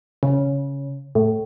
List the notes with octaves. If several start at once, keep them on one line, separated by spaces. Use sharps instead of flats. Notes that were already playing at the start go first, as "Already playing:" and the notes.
C#3
A2